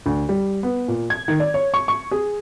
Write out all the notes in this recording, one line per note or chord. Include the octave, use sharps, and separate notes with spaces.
D2
G3
B3
A#2
G#6
D#3
D5
C#5
C#6
C#6
G#4